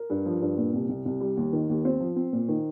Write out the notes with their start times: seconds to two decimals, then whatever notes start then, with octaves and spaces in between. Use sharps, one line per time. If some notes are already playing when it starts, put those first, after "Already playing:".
Already playing: A#4
0.10 G2
0.26 F3
0.41 G2
0.58 A#2
0.74 C2
0.89 C2
1.05 C2
1.21 G3
1.37 D#2
1.53 D#3
1.69 D#2
1.85 C4 C5
2.00 F3
2.16 C4
2.33 A#2
2.49 D#3